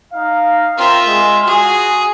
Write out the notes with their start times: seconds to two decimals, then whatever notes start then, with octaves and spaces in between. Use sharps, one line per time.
0.13 D#4 F5
0.78 C4 F4 A#4 E5
1.06 G#3
1.47 F#4 G#4